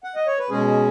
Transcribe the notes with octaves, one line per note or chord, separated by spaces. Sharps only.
F#5
D#5
C#5
B4
B2 G#3 C#4 G#4